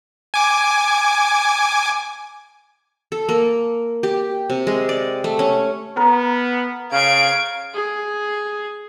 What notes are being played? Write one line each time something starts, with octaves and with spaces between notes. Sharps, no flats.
G#5 D6
A4
A#3
G4
C3
G#3
D5
A3
C#4
B3 A#4
C#3 F5 G#6 D7
G#4